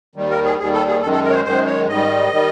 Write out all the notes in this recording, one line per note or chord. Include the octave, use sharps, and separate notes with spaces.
D#2 D#3 G3
A#4
G#4
D#2 D#3 G3 G#4
A4
G#4
F#2 D#3 G#3 A4
A4
A#4
C#5
C5
F#2 D#3 G#3 C5
C#5
G#2 D#3 G3 D#5
D#3 G3